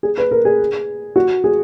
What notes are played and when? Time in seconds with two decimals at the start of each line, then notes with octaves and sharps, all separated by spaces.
0.03 G#4
0.18 B4
0.31 A#4
0.45 G#4
1.16 F#4
1.44 G#4